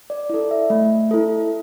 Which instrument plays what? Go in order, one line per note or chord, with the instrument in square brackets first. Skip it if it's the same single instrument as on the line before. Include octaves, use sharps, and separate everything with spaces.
[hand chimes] D5
E4 A4 D5
E5
A3
E4 A4